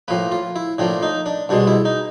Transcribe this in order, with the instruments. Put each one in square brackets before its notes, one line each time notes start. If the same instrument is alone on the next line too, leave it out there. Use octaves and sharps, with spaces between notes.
[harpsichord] A2 F3 A#3 B4
F4
E4
A2 F3 A#3 D4
D#4
D4
C2 B2 G#3 D4
E4
D#4